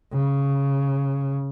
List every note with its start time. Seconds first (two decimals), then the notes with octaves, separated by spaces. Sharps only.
0.13 C#3